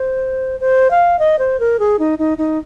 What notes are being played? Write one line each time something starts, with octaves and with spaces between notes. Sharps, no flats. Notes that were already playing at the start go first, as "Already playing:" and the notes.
Already playing: C5
C5
F5
D#5
C5
A#4
G#4
D#4
D#4
D#4